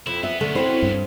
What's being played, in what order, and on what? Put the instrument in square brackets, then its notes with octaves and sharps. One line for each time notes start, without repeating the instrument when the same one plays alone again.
[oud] F2 [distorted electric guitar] E4
[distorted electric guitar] B3 [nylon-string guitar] E5
[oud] D3 [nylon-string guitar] A3 [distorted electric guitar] B3 C#4
[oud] F#3 C4 E4 [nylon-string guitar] C5
[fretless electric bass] G2